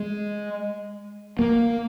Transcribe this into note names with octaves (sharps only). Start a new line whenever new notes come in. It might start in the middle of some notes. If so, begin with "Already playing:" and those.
Already playing: G#3
A#3